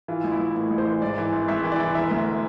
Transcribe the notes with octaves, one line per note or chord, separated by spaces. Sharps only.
E3 F4
A1
E4
A1
A2
A1
C5
E3
G#2 D5
E3
G#1
G#1 E5
E3
D5
E3
E1 E5
D2